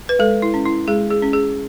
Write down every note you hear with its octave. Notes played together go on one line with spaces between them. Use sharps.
B4
G#3 A4
E4
C#4
E4
G#3 G#4
G#4
C#4
G#4